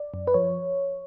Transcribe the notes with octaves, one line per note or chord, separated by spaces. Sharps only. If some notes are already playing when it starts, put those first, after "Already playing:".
Already playing: D5
F#2
B4
F3 C#5